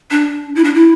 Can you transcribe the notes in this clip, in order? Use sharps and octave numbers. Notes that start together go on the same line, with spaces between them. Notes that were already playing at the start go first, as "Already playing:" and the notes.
D4
E4
D4
E4